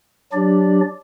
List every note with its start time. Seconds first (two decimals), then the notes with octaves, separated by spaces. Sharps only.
0.33 F#3 D4 G4 D5